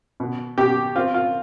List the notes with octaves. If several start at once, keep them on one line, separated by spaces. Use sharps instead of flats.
B2
B2 G4
C4 F4
F4